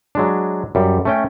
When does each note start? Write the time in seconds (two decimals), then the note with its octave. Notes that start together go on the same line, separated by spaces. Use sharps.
0.15 F#3 G#3 D4
0.75 F#2 G3
1.05 A3 C#4 G5